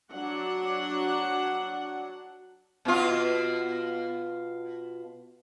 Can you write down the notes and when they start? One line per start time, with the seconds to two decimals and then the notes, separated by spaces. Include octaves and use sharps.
0.13 F#3 D4 F#5
2.85 B2 F4